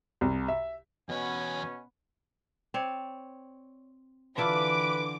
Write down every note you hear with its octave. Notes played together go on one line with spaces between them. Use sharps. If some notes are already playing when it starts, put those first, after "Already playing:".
C2
E5
E2 B2 B3 C#4 C#5 G#5
C4 C#5 D5
D3 E3 D4 E4 F4 B4 D6